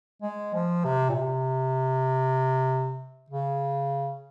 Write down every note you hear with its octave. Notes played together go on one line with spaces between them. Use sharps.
G#3
F3
C3
A#2
C3
C#3